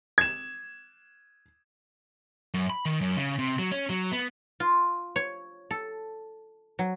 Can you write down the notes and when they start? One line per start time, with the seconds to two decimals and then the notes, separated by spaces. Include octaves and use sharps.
0.18 G#6 E7
2.54 F#2
2.70 B5
2.85 D#3
3.01 F#2
3.17 C#3
3.39 C3
3.59 F#3
3.72 C#4
3.90 F#3
4.12 B3
4.60 F4
5.16 C#5
5.71 A4
6.79 F#3